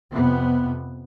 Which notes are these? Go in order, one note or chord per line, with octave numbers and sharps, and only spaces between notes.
F2 C3 B3